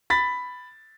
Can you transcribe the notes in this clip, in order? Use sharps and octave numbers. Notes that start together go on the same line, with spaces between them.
B5 A6 B6